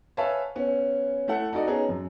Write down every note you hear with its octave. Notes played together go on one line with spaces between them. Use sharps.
B4 C#5 E5 F5 G#5 A5
B3 C#4
A3 E4 A4 F#5
D#4 F#4 A4 D5 D#5
B3 C#4 D#4 G#4
F#2